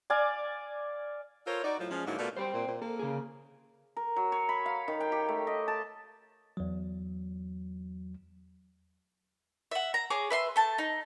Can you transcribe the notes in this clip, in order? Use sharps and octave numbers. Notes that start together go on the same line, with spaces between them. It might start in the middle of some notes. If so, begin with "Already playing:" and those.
D5 F5 G#5 D6
F4 A4 A#4 C5 C#5
D#4 F#4 D5
A2 F3 F#3
F3 G#3 C#4
G#2 D3 F#3 A#3 D#4 E4
B2 A3 A#3 F4 D5
G3 C5 G5 C6
A#2
A#2
A#3 A4
C#3 G#4
A#4
F#3
C#5
B5
F5
D#3
G5
G4
A3
D#5
A5
E2 F#3
E5 F#5
A#5
G#4 C#5 D6
B4 E5 C6
A3 A5
D#4